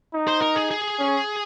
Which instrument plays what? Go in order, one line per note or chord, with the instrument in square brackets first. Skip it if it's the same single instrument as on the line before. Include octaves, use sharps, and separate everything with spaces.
[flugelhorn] D#4
[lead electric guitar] C5
A#4
G#4
G#4
[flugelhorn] C#4